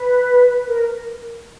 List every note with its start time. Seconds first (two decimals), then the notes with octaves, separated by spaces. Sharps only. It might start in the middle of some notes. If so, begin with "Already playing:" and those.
Already playing: B4
0.67 A#4